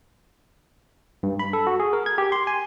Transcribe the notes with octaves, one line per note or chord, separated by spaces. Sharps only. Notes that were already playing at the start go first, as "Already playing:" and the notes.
G2
B5
A4
F#4
G#4
A#4
G#6
G4
C6
G#5